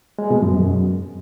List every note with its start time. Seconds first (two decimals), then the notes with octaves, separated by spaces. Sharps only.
0.19 G#3
0.30 B2
0.42 F#2
0.54 F#2